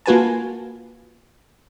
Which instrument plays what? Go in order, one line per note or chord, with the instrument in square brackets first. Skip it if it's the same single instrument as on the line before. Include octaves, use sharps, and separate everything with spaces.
[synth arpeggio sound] A#3 F4 F#4 B4 G#5 A5